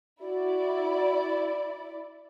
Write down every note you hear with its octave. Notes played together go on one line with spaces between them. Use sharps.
E4 F#4 D5